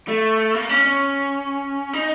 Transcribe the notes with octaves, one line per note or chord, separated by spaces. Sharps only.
A3
A#3
C#4
C#4
D#4